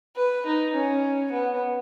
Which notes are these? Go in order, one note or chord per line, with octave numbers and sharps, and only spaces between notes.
B4
D#4
C#4
B3